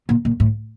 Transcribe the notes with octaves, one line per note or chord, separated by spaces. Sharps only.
A#2
A#2
A2